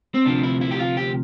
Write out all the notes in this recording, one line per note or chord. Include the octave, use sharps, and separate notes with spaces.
C4
D2 C3 F3 D4
E4
E4
G4
F4
G4